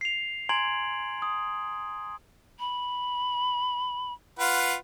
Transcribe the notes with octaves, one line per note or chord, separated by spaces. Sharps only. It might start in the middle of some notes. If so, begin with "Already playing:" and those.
C7 F7
G#5 A#5 C6 G#6 D7 F#7
D#6
B5
F4 B4 F#5